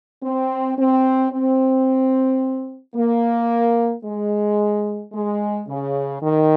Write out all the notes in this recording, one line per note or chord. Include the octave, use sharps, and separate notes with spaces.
C4
C4
C4
A#3
G#3
G#3
C#3
D#3